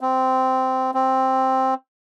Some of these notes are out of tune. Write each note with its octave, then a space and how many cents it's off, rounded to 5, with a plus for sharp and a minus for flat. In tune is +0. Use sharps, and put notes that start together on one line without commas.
C4 -10
C4 +5